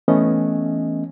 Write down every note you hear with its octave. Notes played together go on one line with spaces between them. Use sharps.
E3 A3 B3 C#4 D#5